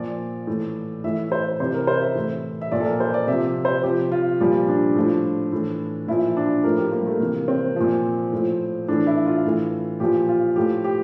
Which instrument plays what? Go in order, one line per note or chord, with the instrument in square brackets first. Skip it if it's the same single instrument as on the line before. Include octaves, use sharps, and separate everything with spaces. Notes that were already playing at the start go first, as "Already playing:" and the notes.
Already playing: [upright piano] A#2 F3 D5
A2 E3
A2 E3 E5
C5
C3 E3 C5
A#4
C5
E5
A2 E3
E5
A#2 F3 D5
A4
A#4
C5
D5
C3 E5
F3
C5
C3 F3 G4
F4
A#2 F3 G3
D4
A2 F3
A2 E3
A#2 F3 E4
D4
A2 F3 A#4
G4
A#3
G3
A3
C3 E3 A#3
C4
A#2 F3
A2 F3
A2 E3 D4
E4
F4
A2 E3
A#2 F3 G4
F4
A2 F3 G4
G4